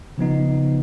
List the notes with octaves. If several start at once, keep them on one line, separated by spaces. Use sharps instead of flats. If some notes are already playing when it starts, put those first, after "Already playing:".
C#3 F3 B3 D#4